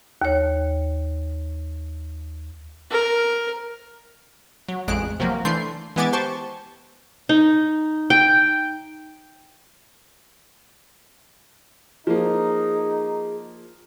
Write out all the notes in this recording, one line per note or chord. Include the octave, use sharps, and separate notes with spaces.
D#2 C#5
A#4
F#3
A1 F2 G#3 F#6 D7
C3 F3 F#3 A#3
E3 A3 D4 C6 G6 C7
E3 G#3 B3 G#5 D6 A6
G4 C5 A5 C#6
D#4
G5
F3 A#3 D#4 G#4